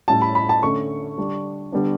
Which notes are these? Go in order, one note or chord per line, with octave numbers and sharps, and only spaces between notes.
A2 G3 C#4 A5
B5
B5
A5
D3 A3 C#4 C#6
D3 G3 D4
D3 G3 B3 D4